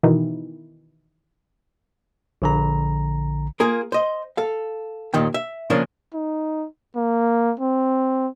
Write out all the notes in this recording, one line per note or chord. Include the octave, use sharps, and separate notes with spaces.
B2 D#3 E3
A#1 D3 A#5
A#3 F4 G#4 A#4
C5 D#5
A4 F5
D#2 A#2 D#3 G5
E5
C#3 F3 A#3 C#4 D4
D#4
A#3
C4